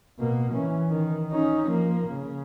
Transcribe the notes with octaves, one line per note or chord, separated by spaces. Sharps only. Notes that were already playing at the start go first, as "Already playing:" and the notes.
B2 A#3
E3 C#4
D#3
C#4 D#4
F3 A#3
C#3